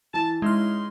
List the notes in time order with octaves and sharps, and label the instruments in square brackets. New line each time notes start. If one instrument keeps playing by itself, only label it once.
[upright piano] E3 [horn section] A5
[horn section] C#3 D#4 C6 [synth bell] G#3 F6 [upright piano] E4